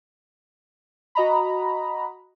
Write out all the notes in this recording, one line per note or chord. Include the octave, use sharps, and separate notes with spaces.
F#4 D#5 A#5 B5